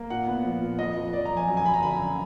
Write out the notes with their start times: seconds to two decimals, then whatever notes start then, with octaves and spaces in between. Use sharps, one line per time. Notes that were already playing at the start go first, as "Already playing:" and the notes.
Already playing: A#3
0.10 A#2 F#5
0.27 B3
0.44 F3
0.62 A#2
0.79 F2 D#5
0.97 F3
1.13 F3 D5
1.26 F2 A#5
1.37 G#5
1.48 F#2
1.57 G#5
1.66 F#2 B5
1.74 A#5
1.82 D3 B5
2.00 F#2